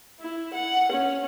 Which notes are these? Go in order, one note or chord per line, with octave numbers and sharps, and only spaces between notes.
E4
F#5
C#4